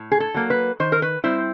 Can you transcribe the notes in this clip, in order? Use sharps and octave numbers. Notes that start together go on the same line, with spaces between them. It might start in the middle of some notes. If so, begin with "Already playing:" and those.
Already playing: A2
G#4
A4
F#3 A#3
B4
D#3 C5
A#4
B4
G3 C4 E4 C5